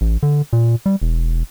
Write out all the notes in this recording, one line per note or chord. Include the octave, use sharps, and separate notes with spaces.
A1
D3
A#2
G3
E1